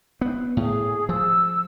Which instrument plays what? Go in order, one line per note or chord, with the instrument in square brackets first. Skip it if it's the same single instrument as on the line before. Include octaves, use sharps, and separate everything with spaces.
[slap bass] B3
[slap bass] A2 [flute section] G#4
[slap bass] F3 [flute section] E6